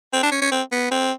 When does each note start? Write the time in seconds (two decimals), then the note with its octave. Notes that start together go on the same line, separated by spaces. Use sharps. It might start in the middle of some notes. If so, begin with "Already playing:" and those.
0.13 C4
0.23 D4
0.32 C#4
0.42 C#4
0.52 C4
0.72 B3
0.91 C4